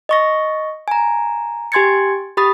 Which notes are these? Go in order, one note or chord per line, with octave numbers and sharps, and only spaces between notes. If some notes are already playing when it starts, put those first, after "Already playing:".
D#5 C#6 A#6
G#5 A#5
G4 G#5 C6 G#6 A6 C#7
G4 B5 D#6 A6